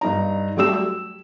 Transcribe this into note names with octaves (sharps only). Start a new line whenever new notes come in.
G2 D#4 A#5
F#3 G3 A3 G4 E6 E7
E6